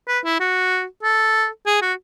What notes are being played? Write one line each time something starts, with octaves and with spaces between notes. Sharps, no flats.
B4
E4
F#4
A4
G#4
F#4